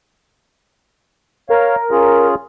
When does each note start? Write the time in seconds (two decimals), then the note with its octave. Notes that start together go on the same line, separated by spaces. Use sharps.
1.50 A#4 C#5 F5
1.91 C#4 F4 G#4